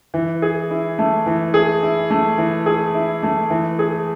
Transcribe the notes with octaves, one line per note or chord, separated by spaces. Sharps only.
E3
G#4
E4
A3
E3
G#4
E4
A3
E3
G#4
E4
A3
E3
G#4